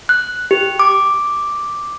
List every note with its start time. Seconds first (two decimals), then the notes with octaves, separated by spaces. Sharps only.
0.09 F#6
0.51 G4
0.79 D6